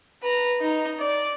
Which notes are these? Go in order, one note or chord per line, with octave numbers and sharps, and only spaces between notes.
B4 A#5
D#4
D5